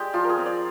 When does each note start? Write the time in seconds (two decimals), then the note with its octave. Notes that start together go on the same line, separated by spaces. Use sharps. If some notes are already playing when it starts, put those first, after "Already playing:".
Already playing: G#3 G4 D5
0.14 F3 F4
0.24 A#4
0.29 G#4
0.37 C4
0.46 D5